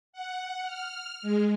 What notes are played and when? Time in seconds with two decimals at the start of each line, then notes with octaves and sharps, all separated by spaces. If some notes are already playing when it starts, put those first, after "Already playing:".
0.13 F#5
0.66 F6
1.22 G#3